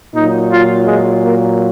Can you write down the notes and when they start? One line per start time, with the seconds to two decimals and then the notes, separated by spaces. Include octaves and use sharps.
0.14 A#2 F#3 D#4
0.51 F4
0.86 G#3
1.23 A#3